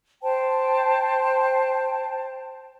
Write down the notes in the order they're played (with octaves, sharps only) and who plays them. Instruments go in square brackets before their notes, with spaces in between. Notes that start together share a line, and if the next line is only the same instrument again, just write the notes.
[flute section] C5 G5 A5